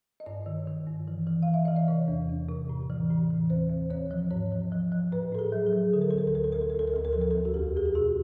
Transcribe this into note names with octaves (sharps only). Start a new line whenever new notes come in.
D#5
G2 D5
D#3
D#3
G2
E3
E3
F5
E3
E5
E3 D#5
D5
C3 C#5
E2
E2
C3
A2
E3
A2
E3
D#2 C5
D#2
D#2 C#5
F3
G#2 C#5
F3
F3
F3
A2 B4
A2 A4
G#4
F#3
G#4
F#3
D3 A4
A#4
D2 A4
A#4
A4
D2 A#4
A4
D2 A#4
A4
A#4
D2 A4
A#4
D2 A4
A#4
F3 A4
A#4
D2 A4
F#4
E2 G4
E2 G#4
G4
B2 F#4